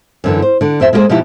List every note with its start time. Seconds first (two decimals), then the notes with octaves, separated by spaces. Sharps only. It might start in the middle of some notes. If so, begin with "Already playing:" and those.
0.24 F#2 D3 E3
0.42 C5
0.61 D3 D4
0.80 F2 E4 C5 E5
0.93 G#3 A#3 E4 G4 G#4 C5
1.09 B2 F3 B3 D#4 E4 G4